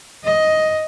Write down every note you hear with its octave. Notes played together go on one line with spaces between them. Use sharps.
D#5